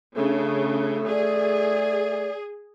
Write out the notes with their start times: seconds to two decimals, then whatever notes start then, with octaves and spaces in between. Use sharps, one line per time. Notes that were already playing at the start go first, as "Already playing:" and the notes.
0.17 C#3 A3 D4
1.09 G#4 D5